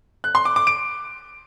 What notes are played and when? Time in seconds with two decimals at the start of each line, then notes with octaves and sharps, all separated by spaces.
0.24 F#6
0.35 C6
0.45 D6
0.56 D6
0.67 D7